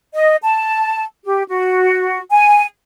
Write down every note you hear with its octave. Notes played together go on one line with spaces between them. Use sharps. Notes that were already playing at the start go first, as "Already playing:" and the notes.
D#5
A5
G4
F#4
G#5